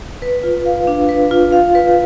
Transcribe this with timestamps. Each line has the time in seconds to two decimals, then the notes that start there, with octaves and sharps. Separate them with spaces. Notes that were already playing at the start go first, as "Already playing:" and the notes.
0.22 B4
0.43 F4
0.66 F5
0.87 D4
1.09 B4
1.31 F4
1.52 F5
1.75 B4